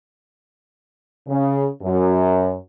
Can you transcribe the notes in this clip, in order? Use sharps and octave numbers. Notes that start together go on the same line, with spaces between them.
C#3
F#2